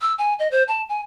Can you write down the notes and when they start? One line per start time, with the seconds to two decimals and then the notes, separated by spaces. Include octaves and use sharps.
0.01 E6
0.18 G#5
0.39 D#5
0.51 C5
0.68 A5
0.89 G#5